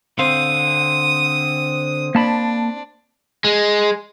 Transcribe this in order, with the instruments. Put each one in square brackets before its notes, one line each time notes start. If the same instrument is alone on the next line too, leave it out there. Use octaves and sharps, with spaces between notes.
[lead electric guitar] D3 F5 [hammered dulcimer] C4 [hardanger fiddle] D#6
[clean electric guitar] A#3 A5 B5 [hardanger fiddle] D4
[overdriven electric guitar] G#3